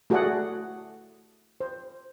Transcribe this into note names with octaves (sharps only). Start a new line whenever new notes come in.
A3 F#4 G#4 A4 D5 F#5
C5